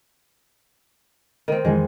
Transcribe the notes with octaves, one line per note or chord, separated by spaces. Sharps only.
D#3 C4
F2 D#3 E3 G#3